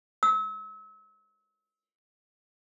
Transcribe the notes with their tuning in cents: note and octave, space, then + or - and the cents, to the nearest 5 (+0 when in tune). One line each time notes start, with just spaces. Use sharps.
E6 -35